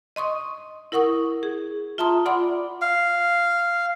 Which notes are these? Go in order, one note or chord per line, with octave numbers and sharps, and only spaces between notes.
D#5 C6 C#6 D#6
E4 A#4 F#5 C#6 D#6
G#4
F4 E5 A5 A#5 C6 D#6
F4 D5 F#5 B5 C6 D6
F5